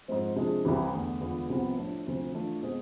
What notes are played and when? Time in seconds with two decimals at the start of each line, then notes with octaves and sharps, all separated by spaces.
0.08 G#2 F3 G#3 C4
0.36 C3 F3 G#3 D4 G#4
0.65 C2 C3 E3
0.93 E2 D3 A3
1.21 E2 D3 G#3 B3 F4
1.49 C2 C3 F3 B3
1.78 A2 F3 A3 D4
2.06 D2 C3 F3
2.34 E3 A3 D4 F4
2.63 B2 G#3 C4 G#4